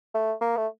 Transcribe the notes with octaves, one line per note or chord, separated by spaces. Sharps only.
A3
A#3
A3